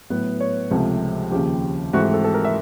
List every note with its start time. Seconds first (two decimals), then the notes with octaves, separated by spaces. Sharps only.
0.10 A2 F#3 B3
0.40 C#5
0.70 C#2 C3 F3 A3
1.31 D#2 C#3 F3 G4
1.93 G#2 E3 A3 C4 F#4
2.03 G4
2.14 A4
2.24 A4
2.34 A#4
2.44 E5